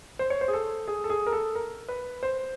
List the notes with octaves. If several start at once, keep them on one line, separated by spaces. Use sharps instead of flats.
C5
C#5
C5
G#4
A4
G#4
A4
G#4
A#4
A4
A#4
B4
C5